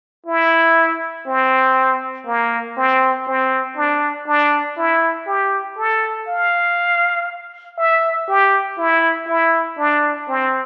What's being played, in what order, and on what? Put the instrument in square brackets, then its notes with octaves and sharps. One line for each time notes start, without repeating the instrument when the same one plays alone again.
[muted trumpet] E4
C4
A#3
C4
C4
D4
D4
E4
G4
A4
F5
E5
G4
E4
E4
D4
C4